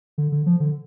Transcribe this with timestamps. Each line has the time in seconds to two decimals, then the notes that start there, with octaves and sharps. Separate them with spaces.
0.18 D3
0.32 D3
0.46 F3
0.60 D3